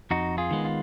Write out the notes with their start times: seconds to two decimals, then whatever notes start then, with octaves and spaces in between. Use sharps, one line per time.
0.11 F2 D#4 F#4
0.38 F4 G#4
0.51 D#3 G#3 B3
0.65 F4